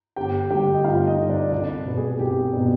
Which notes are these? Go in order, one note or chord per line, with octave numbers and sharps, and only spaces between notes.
G1 G4 G5
G2 D3 G4 G5
D#5
G1 F4 F5
D#4 D#5
G2 D3
D4 D5
C2 D4 D5
B2 B3 D4
G#4
C2 G4
B2 B3 D4